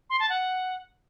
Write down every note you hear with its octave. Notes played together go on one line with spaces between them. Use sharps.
C6
A5
F#5